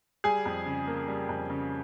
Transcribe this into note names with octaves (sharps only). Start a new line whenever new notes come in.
G3 G#4 G#5
F2
C#3
A#3
G3
F2
C#3